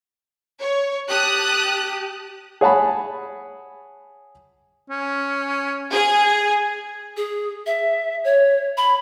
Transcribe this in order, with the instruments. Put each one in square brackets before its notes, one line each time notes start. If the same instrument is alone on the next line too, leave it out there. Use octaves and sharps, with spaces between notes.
[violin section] C#5
[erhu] G4 [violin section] A5 D#6 F#6
[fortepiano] G#4 C#5 F#5 A5 B5
[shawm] C#4
[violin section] G#4
[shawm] G#5
[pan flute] G#4
E5
C#5
B5